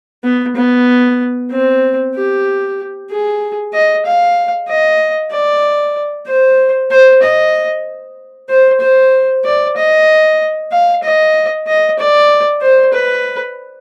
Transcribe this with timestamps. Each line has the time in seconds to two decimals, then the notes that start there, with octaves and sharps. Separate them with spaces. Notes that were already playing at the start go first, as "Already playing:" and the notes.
0.24 B3
0.56 B3
1.51 C4
2.15 G4
3.10 G#4
3.73 D#5
4.05 F5
4.68 D#5
5.31 D5
6.27 C5
6.90 C5
7.22 D#5
8.49 C5
8.81 C5
9.44 D5
9.76 D#5
10.72 F5
11.03 D#5
11.67 D#5
11.99 D5
12.62 C5
12.93 B4